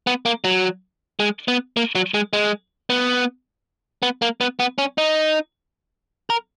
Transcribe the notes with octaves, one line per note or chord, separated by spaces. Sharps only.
B3
A#3
F#3
G#3
B3
A#3
F#3
G#3
G#3
B3
B3
A#3
B3
B3
C#4
D#4
A#4